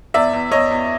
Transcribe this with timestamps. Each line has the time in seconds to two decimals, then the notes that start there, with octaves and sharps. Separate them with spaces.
0.14 E2 D5 E5
0.33 E2
0.51 E2 C#5 D#5
0.71 E2